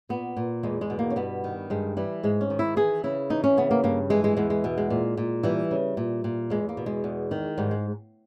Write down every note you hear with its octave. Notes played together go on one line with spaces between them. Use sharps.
A#2 B3
A#2
E2 G#3
G#3
B2
A#3
C#4
G2 B3
D#3
G2 G#3
E3 G3
G#2 G#3
C#4
D#3
E4
E3 G#4
C#3 E4
E3 D#4
C#4
C#3 B3
A#3
G2 A#3
E3 G#3
G#3
E2 G#3
G#3
B2
G#3
A#2
A#2
E3 G3
C#3
A#2
A#2
E2 G#3
A#3
B2
G#3
E2
D#3
G#2 G3
G#3